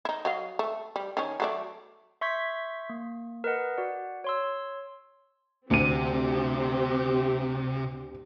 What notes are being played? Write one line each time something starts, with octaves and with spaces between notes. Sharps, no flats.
D#4 E4
F#3 D#5 F5
A3
G3
D#3 C#4
F#3 A3 D5
E5 C6 C#6 G6 G#6 B6
A#3
A#4 B4 D#5 F#5
F#4 D5 F#5
C#5 C6 E6
D2 C3 C4 G4 D#7